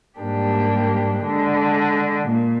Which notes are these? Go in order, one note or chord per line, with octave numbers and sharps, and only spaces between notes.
G#2 G3 A#3 D4 G4
D3 G#3 D4
A#2